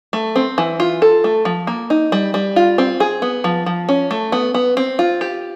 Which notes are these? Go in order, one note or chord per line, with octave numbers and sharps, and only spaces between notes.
A3
C4
E3
F4
A4
A3
F3
A#3
D#4
G3
G3
F4
C4
G#4
B3
F3
F3
C#4
A3
B3
B3
C4
F4
G4